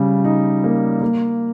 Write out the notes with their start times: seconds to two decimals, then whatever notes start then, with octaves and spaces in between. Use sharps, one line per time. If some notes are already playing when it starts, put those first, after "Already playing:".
Already playing: C#3 G3
0.24 D#4
0.64 A#3
1.01 A#3